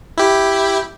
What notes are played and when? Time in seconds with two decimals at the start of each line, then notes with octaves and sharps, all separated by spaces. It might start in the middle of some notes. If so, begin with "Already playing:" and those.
0.18 E4 G4